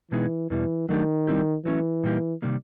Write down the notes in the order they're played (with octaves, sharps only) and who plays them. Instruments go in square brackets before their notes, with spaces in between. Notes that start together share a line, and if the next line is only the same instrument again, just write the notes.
[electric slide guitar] B2 G#3 B3 D#4 G#4 [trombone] E3
[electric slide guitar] E2 B2 G3 [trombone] E3
[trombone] D#3 [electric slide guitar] F#3 A3 D4 G4
[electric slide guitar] G3 C4 E4 G4
[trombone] E3 [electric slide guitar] F#3 A3 C#4
[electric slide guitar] A#2 G3 A#3 D#4 G4
C3 D#3 G3 A#3